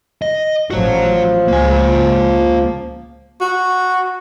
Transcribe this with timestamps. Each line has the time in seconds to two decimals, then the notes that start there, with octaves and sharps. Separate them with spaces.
0.22 D#5
0.71 A1 F3 F#4 C#5
1.48 C#2 A#3 G#5
3.41 F#4